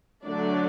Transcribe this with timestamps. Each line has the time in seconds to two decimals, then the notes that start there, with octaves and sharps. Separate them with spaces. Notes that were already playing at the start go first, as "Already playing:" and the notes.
0.24 D3 F#3 A3 D4 D5